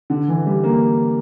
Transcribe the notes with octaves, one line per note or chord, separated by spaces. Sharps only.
D3
E3
G3
A#3